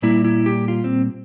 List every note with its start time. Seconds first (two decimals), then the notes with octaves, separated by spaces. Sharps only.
0.02 A#2 G3 A#3 E4
0.24 E4
0.46 G4
0.68 F4
0.84 C4